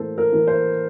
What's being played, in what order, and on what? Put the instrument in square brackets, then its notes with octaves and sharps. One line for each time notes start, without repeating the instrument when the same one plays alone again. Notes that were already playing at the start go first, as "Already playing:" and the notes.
Already playing: [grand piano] A2 E3 A#3 A4 C5
A#4
E3 A#3
C5